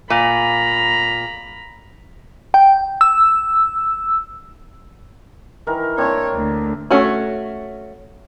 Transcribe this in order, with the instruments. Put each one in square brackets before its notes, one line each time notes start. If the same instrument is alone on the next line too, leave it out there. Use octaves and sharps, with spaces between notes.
[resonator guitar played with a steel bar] A#2 [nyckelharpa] A#5 B5
[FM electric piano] G5
E6
[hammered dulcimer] D#3 E3 A#4
[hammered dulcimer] A#3 C4 D4 [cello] C#5
[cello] D2
[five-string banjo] A3 C#4 F#4